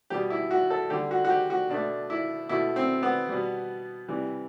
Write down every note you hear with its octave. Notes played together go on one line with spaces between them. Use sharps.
B2 G3 G4
E4
F#4
A4
D3 G3 G4
F#4
F#4
G4
F#4
B2 A3 D4
E4
B2 A3 E4
C4
B3
B2 G3
C3 E3 G3